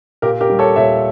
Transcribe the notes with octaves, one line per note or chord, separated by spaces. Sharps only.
A#2 G4 A#4
G4 A#4
G3
A4 C#5
A#2 C#5 E5